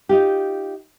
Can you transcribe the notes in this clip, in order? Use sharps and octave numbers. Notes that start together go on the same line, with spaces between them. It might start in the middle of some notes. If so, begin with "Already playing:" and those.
D#4 F4 G4